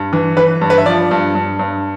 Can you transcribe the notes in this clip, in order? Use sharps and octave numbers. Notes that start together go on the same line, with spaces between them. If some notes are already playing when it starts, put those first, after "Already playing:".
Already playing: G2
E3
E3 B4
G2
B4
E5
F3 D5
G2
G2
G2